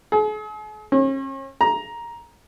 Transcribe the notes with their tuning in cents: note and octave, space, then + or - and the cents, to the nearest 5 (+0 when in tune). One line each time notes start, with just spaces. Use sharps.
G#4 +45
C#4 -40
A#5 +10